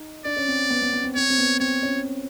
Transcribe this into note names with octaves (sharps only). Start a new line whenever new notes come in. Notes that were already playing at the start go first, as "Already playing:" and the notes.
Already playing: D#4
D4 D5
C#4
C4
B3
B3
B3
C4
C4 C#5
C4
B3
C4 C#5
C#4